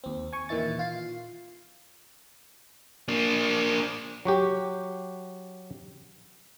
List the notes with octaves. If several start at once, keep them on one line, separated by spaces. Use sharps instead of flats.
D#2 C4
G#5 C#6
A#2 D#3 E3 E4 A6
F4 C7
A#3 D4
F#3 F#4 G4